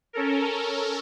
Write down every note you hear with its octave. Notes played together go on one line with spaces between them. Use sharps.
C#4 A4 A#4